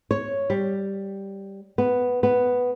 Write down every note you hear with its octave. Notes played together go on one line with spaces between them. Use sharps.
C#5
G3
B3
B3